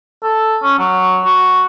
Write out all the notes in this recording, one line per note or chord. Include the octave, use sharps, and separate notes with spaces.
A4
C#4
F#3
F#4